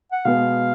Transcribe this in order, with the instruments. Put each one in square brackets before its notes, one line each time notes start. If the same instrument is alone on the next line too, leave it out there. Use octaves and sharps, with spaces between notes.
[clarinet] F#5
[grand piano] B2 G#3 B3 [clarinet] F5